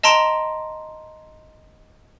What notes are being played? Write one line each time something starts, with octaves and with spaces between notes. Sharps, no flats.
D#5 A5 A#5 C6 D7 E7